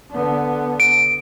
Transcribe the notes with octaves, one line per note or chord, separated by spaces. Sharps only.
D3 B3
D7